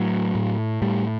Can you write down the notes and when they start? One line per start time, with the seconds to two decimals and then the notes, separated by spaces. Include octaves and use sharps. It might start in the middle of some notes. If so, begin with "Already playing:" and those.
Already playing: A2 F#3
0.35 A2
0.82 A2 G3